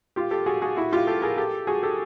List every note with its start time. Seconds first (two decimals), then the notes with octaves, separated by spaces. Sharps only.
0.16 F4 G4
0.31 G4 A4
0.46 F#4 G#4
0.62 F#4 G#4
0.77 E4 F#4
0.92 F4 G4
1.07 G4 A4
1.22 G#4 A#4
1.37 G4 A4
1.67 F#4 G#4
1.83 G4 A4